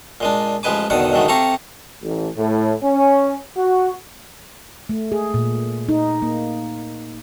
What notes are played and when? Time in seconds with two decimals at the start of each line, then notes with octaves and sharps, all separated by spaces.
0.21 A#2 G#3 D4
0.63 A1 F3 G#3 B4 G#5 D6
0.90 E2 B2 D3 D#3 D5 F#5
1.12 G#2 D3 D#3 F#3 G#3 A3
1.28 C3 G4 A4 F5 A#5 C#6
2.03 A1
2.37 A2
2.83 C#4
3.57 F#4
4.89 A3
5.12 G#4
5.34 A#2
5.89 D#4
6.22 A#3